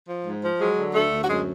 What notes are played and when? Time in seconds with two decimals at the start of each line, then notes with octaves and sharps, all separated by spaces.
0.08 F3
0.25 G#2
0.43 F3
0.60 F#3 G#3 G#4
0.77 D3
0.94 D2 A3 A4
1.12 D2
1.24 F#4
1.29 F#2 G#3 G#4